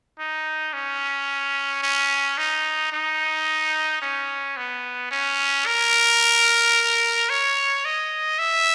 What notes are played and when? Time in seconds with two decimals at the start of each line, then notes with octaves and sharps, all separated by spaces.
0.20 D#4
0.74 C#4
1.83 C#4
2.38 D#4
2.93 D#4
4.02 C#4
4.57 B3
5.11 C#4
5.67 A#4
7.30 C#5
7.85 D#5
8.39 E5